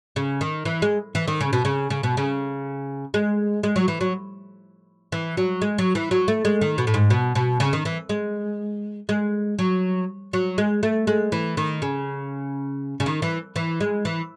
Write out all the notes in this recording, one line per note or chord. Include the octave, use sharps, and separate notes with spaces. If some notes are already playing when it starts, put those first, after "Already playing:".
C#3
D#3
E3
G#3
E3
D#3
C#3
B2
C#3
C#3
B2
C#3
G#3
G#3
F#3
E3
F#3
E3
F#3
G#3
F#3
E3
F#3
A3
G#3
D#3
B2
A2
G#2
B2
B2
C#3
D#3
E3
G#3
G#3
F#3
F#3
G#3
A3
G#3
E3
D#3
C#3
C#3
D#3
E3
E3
G#3
E3